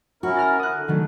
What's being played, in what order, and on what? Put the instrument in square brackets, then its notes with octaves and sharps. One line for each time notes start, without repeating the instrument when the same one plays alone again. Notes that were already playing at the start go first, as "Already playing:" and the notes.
[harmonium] C#4 E4 A#4 [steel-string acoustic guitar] F#4
[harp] A#5 F6 A6
[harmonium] E4 [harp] D#6 F#6
[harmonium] D3
[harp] D#3 F#3 A3